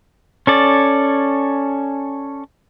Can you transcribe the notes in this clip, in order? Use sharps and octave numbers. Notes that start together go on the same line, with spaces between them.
C#4 A4 D5